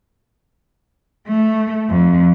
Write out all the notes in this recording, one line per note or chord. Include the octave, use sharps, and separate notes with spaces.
A3
F2